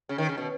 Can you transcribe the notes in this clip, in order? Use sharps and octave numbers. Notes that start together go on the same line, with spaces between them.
C#3
D#3
C#3
B2